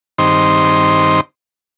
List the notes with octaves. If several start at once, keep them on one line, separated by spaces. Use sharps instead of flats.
G2 D#3 C4 D#4 C5 C6